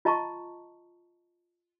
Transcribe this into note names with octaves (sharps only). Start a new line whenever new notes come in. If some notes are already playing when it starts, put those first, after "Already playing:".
F4 D#5 A5 A#5 C#6